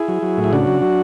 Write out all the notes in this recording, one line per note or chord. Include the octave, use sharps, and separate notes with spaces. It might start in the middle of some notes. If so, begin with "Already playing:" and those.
Already playing: E4 G#4
F#3
F#3
A2
E4
C#3 D4 F#4
F#3
F#3